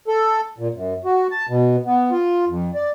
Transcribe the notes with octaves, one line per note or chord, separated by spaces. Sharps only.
A4
A#2
F#2
F#4
A5
B2
B3
F4
F2
D5